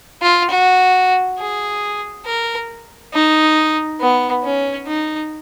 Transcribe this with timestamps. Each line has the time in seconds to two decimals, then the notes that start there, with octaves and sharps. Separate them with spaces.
0.22 F4
0.51 F#4
1.38 G#4
2.25 A#4
3.13 D#4
4.00 B3
4.43 C#4
4.87 D#4